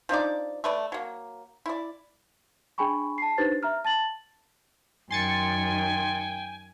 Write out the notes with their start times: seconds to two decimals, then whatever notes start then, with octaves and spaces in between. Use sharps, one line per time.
0.09 F3 D4 D#4 D5
0.64 A3 B4 D5
0.92 F#3 A#3
1.66 E4 D5
2.78 D4 G#4 G5 G#5 B5 C#6
3.18 A5 C7
3.38 D4 D#4 G4 B4 C5 A6
3.63 E5 A#5 F6
3.85 A5 A6 F#7
5.11 F#2 D#3 G5 G#5 C6 A6 C#7